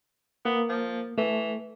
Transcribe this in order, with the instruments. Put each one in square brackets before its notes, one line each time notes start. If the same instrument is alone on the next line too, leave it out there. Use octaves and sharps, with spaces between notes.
[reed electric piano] A#3 [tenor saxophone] B3
[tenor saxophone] F3
[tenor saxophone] E3 [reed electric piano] A3